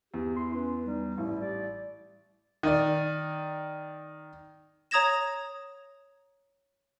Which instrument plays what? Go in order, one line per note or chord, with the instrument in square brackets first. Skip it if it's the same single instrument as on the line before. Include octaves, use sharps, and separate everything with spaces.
[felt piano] E2 [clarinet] G4
[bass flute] E4 [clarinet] C6
[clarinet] C#4 [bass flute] B4
[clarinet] G3 [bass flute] D#4
[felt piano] A1 [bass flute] E4
[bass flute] G3 [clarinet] D5
[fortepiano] D#3 D5
[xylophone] C#5 A#5 D#6 G#6 A#6 E7